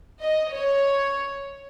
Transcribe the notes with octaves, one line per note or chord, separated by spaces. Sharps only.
D#5
C#5